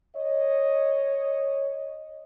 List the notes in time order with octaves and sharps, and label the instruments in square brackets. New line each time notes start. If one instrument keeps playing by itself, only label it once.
[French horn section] C#5 D#5